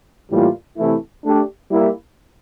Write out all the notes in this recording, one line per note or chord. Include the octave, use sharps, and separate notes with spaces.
A2 E3 G3 A#3 F4
C3 E3 A3 E4
A3 D4 G4
G3 A#3 E4